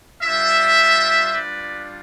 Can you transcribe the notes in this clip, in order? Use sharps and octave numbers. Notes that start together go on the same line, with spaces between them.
G3 D4 F4 C5 E5
G3 D4 F4 B4 D5